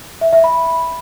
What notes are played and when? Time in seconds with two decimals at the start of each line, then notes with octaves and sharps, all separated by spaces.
0.21 E5
0.33 E5
0.44 B5